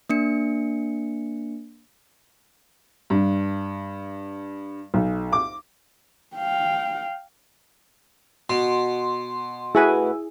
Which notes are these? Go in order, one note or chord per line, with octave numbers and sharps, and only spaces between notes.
A#3 D4 C#7
G2
B1
D6
F5 G5
B2 C6
A3 E4 F#4 G#4 B4 G#5